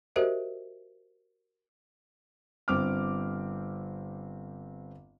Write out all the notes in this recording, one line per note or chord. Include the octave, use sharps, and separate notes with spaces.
F#4 G4 A#4 C5 D#5 E5
G1 C4 D6 F6